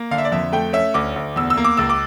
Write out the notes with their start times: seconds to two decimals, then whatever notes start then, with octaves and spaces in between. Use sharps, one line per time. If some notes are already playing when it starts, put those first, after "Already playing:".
Already playing: A#3
0.11 D3 F5
0.18 E5
0.25 D5
0.32 F2 E5
0.52 A3 G5
0.73 C#4 E5
0.94 D2 D6
1.16 D2
1.36 E2 E6
1.50 E6
1.57 A#3
1.64 D6
1.77 C#2 E6
1.90 D6